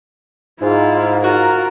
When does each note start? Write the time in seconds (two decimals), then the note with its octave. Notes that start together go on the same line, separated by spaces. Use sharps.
0.62 G#2 E4 F4
1.24 F4 F#4 A#4